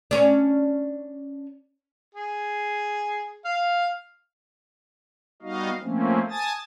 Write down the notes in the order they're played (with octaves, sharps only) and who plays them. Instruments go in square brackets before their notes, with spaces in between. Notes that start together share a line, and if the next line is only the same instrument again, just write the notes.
[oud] C#4 D4
[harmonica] G#4
F5
[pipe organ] G3 B3 D#4 F#4 D#5 F5
F3 A3 A#3 C4 C#4
G#5 A5 D#6 A6